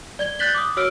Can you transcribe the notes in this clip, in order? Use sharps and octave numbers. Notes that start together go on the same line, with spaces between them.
D5 G#6 G7
F#6 G6 A6 B6 F#7 G7
D6 D#6
F#4 C#5 E6 F6 D7